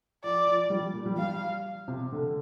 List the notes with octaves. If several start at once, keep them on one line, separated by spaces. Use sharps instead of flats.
F3 D5
F3
F3
G3
A#2
G3
G3 F5
C3
D3